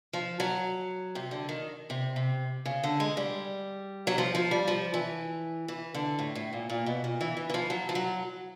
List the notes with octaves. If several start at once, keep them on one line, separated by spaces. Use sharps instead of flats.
F3
F#3
C3
D3
D#3
C3
C3
C#3
D3
G#3
G3
F#3
F3
F3
G3
F3
E3
E3
D3
A2
A2
A#2
A#2
B2
A#2
E3
E3
E3
F3
F#3
F3
F#3